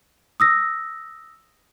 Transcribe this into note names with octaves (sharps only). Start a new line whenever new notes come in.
D#6 E6 A#6